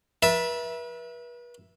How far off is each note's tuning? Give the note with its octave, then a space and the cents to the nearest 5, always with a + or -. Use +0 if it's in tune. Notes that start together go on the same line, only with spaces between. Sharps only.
B4 -40 E5 +0 A5 +0